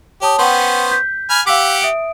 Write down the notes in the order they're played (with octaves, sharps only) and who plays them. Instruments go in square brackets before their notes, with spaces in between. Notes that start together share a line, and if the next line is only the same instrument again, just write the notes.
[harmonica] G4 [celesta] C#5 A5 D#6
[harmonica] B3 C#4 C5 [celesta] F#5 G5
[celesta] G6 B6
[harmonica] G#5 B5 F6
[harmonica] G4 F#5 D6 [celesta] F5 E6 B6
[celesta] E5 D#6 D7